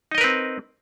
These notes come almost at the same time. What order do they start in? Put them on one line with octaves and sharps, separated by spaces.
D#4 D#5 A#4 B4 C4